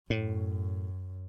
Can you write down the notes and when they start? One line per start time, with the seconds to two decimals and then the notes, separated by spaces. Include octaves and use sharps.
0.10 F#2 A2